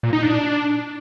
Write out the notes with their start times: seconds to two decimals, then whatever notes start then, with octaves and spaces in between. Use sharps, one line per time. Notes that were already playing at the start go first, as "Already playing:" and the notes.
0.03 A#2
0.13 D#4
0.22 D4